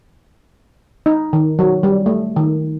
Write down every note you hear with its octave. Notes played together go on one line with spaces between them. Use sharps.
D#4
D#3
F#3
G3
A3
D#3